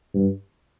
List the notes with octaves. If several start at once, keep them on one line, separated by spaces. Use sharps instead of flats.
G2